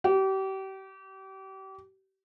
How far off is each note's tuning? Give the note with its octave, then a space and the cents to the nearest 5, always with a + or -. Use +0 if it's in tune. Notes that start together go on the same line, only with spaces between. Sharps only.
G4 -35